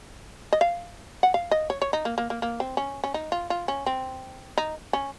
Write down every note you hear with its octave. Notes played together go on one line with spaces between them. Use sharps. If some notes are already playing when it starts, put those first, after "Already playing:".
D#5
F5
F#5
F5
D#5
C#5
C#5
D#4
A#3
A#3
A#3
A#3
C4
C#4
C#4
D#4
F4
F4
C#4
C4
D#4
C#4